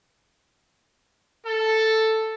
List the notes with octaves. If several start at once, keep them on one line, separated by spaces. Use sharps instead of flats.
A4